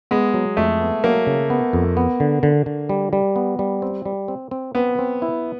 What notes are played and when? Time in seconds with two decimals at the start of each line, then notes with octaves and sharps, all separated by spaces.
0.11 G#3 B3
0.34 F#3
0.57 F2 A3
0.81 B3
1.04 F#3 A#3
1.27 C#3
1.50 B3
1.73 F2
1.97 B3
2.20 D3
2.43 D3
2.66 D3
2.89 G3
3.13 G3
3.36 B3
3.59 G3
3.82 C4
4.05 G3
4.28 C4
4.51 C4
4.75 B3 C4
4.99 C4
5.22 E4